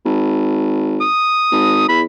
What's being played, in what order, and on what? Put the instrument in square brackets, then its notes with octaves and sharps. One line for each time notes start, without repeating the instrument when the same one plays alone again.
[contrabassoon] G#1
[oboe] D#6
[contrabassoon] G#1
[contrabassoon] E2 [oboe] B5